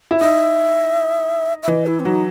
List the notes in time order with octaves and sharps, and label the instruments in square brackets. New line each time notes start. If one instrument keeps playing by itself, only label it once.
[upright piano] E4
[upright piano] D#4 [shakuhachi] E5
[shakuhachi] E5
[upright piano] E3 [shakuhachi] D#5
[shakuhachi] E4
C4
[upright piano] F#3 [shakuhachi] D#4